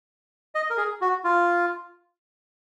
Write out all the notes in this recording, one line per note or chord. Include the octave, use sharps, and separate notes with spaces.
D#5
A#4
G#4
F#4
F4